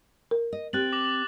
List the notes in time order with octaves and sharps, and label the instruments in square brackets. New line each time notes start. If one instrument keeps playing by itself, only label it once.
[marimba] A#4
[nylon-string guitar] D#5
[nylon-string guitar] C4 G4 [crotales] F#6 A6 F#7
[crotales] D6 A#6 F#7
F#7